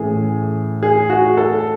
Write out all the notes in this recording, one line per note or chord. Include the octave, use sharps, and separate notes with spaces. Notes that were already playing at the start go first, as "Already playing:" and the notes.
Already playing: A2 E3 A3 C#4 G#4
G#4
F#4
A4